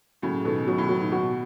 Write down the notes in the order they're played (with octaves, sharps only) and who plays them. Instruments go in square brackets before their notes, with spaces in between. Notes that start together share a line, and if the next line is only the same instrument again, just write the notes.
[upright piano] A2 C#3 [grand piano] F#3
[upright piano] B2 D#3 [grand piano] A4
[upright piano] B2 [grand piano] F#3
[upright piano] A2
[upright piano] B2 [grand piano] F#3
[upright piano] B2 D#3
[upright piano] B2 [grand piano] F#4